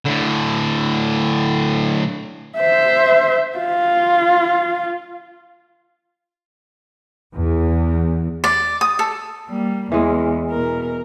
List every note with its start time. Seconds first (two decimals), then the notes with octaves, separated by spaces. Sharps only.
0.05 A2 D3
2.58 C5 E5
3.58 F4
7.34 E2
8.44 D5
8.81 D#6
8.99 A4
9.49 G3 A#3
9.92 E2 E3 G#3 E4
10.51 B2 A#4